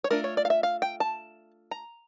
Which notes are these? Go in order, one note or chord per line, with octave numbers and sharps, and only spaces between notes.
C#5
A3 D4 F4 A#4
C#5
D5
F5
E5
F5
G5
A5
A#5